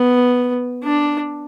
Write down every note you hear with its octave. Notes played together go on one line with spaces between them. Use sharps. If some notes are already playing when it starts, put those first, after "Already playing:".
Already playing: B3
D4